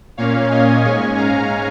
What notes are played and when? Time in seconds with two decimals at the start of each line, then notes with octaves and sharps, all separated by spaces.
0.17 A#2 A#3 C#4 C#5 F5
0.50 D#5 G#5
0.84 G#2 G#3 C#4 G#5 C#6
1.17 F5 A#5